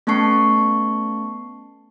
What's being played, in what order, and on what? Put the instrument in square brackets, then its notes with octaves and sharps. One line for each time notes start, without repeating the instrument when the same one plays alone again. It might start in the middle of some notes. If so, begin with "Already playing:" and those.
[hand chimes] A3 B3 C#4 A5 C#6 C7